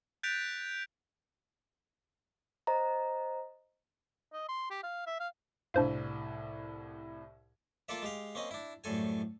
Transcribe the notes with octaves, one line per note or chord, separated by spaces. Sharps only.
F#6 G6 A6 B6 D7 F7
C5 D#5 A#5
D#5
C6
G4
F5
E5
F5
C2 A2 D4 C5 F5
A#3 F4 A4 D5 E5
G#3 G4 F5
A#3 C4 C#4 D#5
D4 E4
C2 F#2 A2 A4 G#5